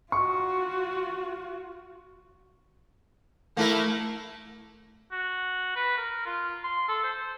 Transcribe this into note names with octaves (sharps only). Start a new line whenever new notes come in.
F4 F#4 C#6
A3 A#3 E4 A#4
F#4
B4
A#4
F4
C6
A4
C5